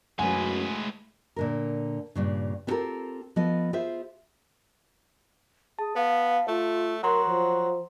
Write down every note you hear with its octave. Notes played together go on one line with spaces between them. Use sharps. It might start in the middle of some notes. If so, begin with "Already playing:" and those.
F#2 A2 G#3 A3 B4 F#5 G#5
A#2 D3 A#4
G2 A#2 C#3
B3 C4 F4 G4 A4 A#4
F3 B3 A4 D#5
F4 G#4 C5 E5
G#4 A5
B3 F5
A3 F4
F#3 A#4 F#5 A#5 C6
F3